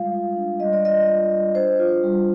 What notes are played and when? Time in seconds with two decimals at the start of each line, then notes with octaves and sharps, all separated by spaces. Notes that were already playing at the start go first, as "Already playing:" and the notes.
Already playing: G3 G#3 F4 F5
0.13 F4
0.36 D4
0.60 G3 D#5
0.73 D5
0.85 F4 D#5
1.08 F4
1.32 G3
1.55 D4 C5
1.79 F4
2.03 G3